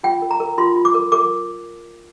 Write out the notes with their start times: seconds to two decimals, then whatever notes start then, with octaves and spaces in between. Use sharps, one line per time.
0.03 F4 G5
0.22 A#4
0.31 A#5
0.40 A#4
0.58 F4 C6
0.76 F4
0.85 D6
0.94 A#4
1.12 A#4 D6